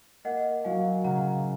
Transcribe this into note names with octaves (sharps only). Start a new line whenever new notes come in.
A#3 D#5 F#5
F#3 F5 G#5
C#3 F#5 A#5